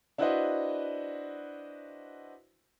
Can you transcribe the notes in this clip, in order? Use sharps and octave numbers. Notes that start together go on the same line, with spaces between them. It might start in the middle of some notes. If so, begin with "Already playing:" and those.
D4 E4 F#4 B4 C5 D#5